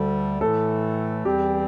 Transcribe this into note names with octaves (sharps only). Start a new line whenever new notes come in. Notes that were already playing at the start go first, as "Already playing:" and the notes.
Already playing: D2 D3 G3 A4
A2 E3 A3 A4
E2 E3 G3 C4 G4